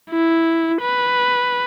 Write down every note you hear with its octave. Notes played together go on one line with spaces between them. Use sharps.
E4
B4